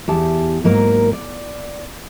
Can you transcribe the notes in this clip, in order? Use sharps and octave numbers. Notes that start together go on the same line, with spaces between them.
E2 G4 A5
G#2 F#3 A#3 A#4
D5